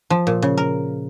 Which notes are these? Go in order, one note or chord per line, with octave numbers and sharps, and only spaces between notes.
F3
A#2
C#3
A#4